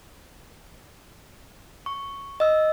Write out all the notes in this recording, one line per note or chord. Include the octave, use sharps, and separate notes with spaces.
C#6
D#5 E6